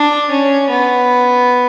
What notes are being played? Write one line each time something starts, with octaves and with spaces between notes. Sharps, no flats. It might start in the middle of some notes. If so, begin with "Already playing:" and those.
Already playing: D4
C#4
B3